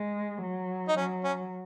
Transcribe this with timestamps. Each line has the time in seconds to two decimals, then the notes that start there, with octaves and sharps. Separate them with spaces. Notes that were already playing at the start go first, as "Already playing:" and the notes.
Already playing: G#3
0.42 F#3
0.88 D#4
0.97 F#3 C#4
1.24 C#4